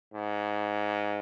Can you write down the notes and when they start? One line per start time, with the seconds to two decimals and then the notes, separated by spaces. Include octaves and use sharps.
0.14 G#2